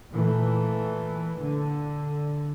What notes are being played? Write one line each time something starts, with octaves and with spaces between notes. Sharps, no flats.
A#2 E3 A3
D3